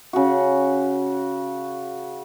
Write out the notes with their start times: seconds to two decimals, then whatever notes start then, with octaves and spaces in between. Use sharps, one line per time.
0.13 C#3 F#4